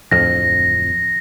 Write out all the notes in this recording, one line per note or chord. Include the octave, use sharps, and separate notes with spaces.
D1 F2 A#6